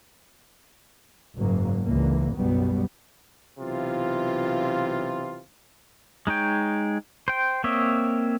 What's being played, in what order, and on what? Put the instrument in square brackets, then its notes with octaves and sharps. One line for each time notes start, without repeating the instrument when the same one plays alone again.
[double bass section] F#1 G#2 F#3 A#3
C#2 D3 E3 A#3
F#1 B1 B2 F#3 G3 B3
[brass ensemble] B1 C3 E3 F4
[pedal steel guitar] G#3 D#4 C#5 G5
C5 G5
A#3 C4 C#5 D#5 E5